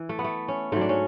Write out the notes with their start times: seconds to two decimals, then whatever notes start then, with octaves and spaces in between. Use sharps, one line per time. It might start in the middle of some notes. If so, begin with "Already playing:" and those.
Already playing: E3
0.09 A3
0.19 B3
0.24 A3
0.48 C#4
0.72 G#2 F#3 A3
0.81 D4
0.89 C#4